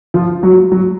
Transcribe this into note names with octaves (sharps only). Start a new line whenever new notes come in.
F3 F4
F#3 F#4
F#3 F#4